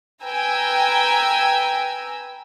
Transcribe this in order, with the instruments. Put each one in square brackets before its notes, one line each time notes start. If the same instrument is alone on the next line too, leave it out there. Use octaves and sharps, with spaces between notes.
[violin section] B4 G5 G#5 A#5 E6